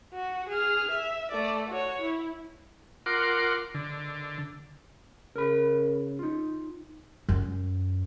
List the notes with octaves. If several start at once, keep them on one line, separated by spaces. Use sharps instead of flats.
F#4
G#4 F6
E5
A3 D5
F#4 C#5
E4
F4 A#4 F#5 C6 D6
D3
C#3 A#4 B5
D#4 F4
F#2